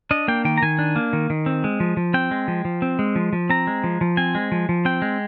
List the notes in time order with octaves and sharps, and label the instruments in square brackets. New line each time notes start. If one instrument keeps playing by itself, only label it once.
[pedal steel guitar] D4 D#5
A#3 G5
D#3 G5
A#5
D#3 G#5
D4
A#3
D#3
D#3
C4
G#3
F3
F3
C4 G5
G#3
F3
F3
C4
G#3
F3
F3
C4 A#5
G#3
F3
F3
C4 G#5
G#3
F3
F3
C4 G5
G#3